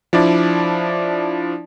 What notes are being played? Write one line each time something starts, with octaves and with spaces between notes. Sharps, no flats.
F3 D4 E4 D5